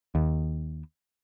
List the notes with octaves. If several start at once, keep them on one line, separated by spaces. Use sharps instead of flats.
D#2